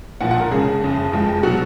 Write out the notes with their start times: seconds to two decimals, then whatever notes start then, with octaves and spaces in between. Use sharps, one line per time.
0.21 B1 A#2 F3 F#5
0.31 F#5
0.40 A#4
0.51 F2 C#3 G#3 G#4
0.81 F#1 F2 C#3
1.11 F1 F2 F3 G#3
1.43 B2 F#3 F#4